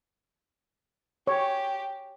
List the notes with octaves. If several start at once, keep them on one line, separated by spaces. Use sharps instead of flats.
G4 C#5